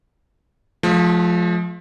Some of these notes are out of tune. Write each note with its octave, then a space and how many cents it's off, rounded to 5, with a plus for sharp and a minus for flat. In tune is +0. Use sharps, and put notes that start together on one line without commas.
F3 +10 A3 -40